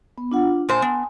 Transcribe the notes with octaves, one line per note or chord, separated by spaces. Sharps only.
B3
D4 F4 F#5
A#2 C5 G#5 A5 C6
B3